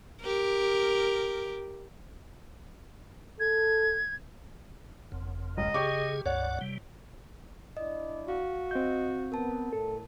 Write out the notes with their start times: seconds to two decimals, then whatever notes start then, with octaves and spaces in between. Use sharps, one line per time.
0.21 G4 A#4
3.40 A4 G#6
5.12 F#1 F2
5.57 C#2 D#5
5.74 C#3 G4 G#4 C#6 D6
6.26 C#2 G2 C#5 D5 F#5
6.61 C3 G3
7.77 D4 E4 D5 D#5
8.28 F#4 F5
8.71 C4 D#5 G6
9.32 B3 A#4 A5
9.73 A2 A4